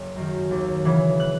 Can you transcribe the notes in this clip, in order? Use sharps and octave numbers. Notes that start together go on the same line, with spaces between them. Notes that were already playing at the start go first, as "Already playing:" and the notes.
Already playing: F#1
F#2 D#3
D#2
C#3 E3
F#6